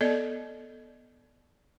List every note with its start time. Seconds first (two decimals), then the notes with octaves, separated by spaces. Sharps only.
0.01 B3 A4 D5 D#5